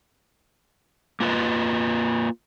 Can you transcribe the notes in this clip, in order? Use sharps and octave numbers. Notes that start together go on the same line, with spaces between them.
A#3 F4 B4 D#5